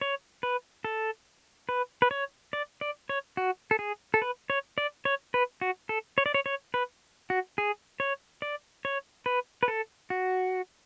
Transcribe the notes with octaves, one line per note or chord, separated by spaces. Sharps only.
C#5
B4
A4
B4
B4
C#5
D5
D5
C#5
F#4
A4
G#4
A4
B4
C#5
D5
C#5
B4
F#4
A4
C#5
D5
C#5
C#5
B4
F#4
G#4
C#5
D5
C#5
B4
B4
A4
F#4